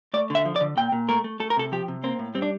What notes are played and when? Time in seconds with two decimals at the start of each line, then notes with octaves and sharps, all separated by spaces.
0.14 A3 D5
0.30 D3 E5
0.45 F3
0.56 D5
0.61 D3
0.77 A#2 G5
0.92 A#2
1.09 A3 A#4
1.24 A3
1.40 A3 A4
1.50 A#4
1.57 C3 A4
1.72 F3 G4
1.88 C3
2.04 A#3 C4
2.19 A2
2.35 G3 C4
2.42 D4